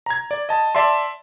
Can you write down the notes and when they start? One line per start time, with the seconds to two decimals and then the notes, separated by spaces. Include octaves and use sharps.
0.06 A#5 G#6
0.31 D5
0.49 D#5 A5
0.75 D5 E5 A5 C6